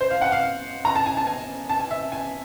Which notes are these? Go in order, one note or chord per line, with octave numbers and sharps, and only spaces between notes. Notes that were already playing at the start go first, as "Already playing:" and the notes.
C5
F5
F#5
F5
A#5
A5
G#5
A5
G#5
A5
G#5
E5
G#5